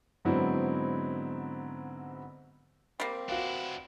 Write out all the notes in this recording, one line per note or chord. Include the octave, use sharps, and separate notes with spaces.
G#2 D3 F#3 B3 C4 E4
G3 A#3 C4
D4 E4 F#4 B4 F5